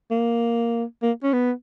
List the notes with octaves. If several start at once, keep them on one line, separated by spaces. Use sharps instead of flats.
A#3
A#3
C#4
B3